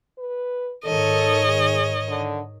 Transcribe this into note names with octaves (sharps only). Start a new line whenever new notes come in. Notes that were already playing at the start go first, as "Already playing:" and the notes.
B4
G#2 D#3 A4 C#5 D#5
G#4
D3